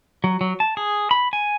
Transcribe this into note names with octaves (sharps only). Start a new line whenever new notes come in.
F#3
F#3
A5
G#4
B5
G#5